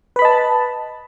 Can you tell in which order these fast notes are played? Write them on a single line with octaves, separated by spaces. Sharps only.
B4 B5 D#5 A5